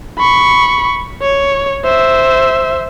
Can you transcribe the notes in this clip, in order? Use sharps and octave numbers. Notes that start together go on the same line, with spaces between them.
B5 C#6
C#5
C5 E5